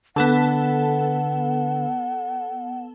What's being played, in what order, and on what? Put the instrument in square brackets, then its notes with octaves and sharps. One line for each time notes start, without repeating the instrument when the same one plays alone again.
[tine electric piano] D3 B4 [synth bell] B3 A4 A5 [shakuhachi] F#5